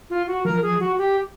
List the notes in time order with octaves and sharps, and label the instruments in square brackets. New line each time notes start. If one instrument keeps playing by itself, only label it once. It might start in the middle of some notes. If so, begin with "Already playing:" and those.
[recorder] F4
F#4
[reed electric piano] F3 [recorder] A#4
[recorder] G#4
F#4
G4